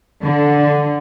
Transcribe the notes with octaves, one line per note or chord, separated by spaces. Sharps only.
D3